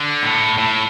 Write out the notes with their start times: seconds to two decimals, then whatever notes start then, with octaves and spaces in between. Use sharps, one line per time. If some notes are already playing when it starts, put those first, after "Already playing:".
Already playing: D3
0.23 A2
0.58 A2